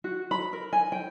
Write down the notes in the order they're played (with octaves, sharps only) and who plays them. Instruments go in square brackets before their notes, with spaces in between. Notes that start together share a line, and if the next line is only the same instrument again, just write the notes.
[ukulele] F#4
B5
A#4
G#5
G5